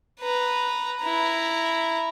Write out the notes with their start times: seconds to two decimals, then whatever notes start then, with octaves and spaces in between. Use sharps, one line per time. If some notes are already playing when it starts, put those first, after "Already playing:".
0.21 B4 A#5
1.01 E4 A#5